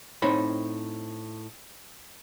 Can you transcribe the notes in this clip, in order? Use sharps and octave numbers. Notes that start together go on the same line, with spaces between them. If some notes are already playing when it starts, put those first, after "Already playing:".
A2 C4 D#4 C5 C#5 B5